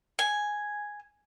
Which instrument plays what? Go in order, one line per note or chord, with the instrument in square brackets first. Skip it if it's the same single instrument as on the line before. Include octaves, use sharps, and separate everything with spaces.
[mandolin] G#5